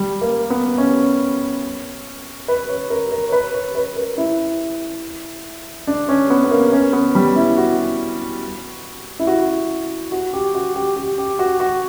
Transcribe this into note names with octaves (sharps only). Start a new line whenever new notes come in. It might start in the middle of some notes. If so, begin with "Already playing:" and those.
Already playing: G3
A#3
B3
C#4
B4
C#5
A#4
A#4
C#5
B4
C#5
B4
A#4
E4
D4
C#4
B3
B3
A#3
C#4
B3
G3
E4
F#4
E4
F#4
F#4
G4
F#4
G4
G4
G4
F#4
F#4